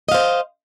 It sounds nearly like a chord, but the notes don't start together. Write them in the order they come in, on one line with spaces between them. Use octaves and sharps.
D#5 F5 C5